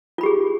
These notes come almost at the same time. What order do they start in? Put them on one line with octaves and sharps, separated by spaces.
F4 B5 G4 G#4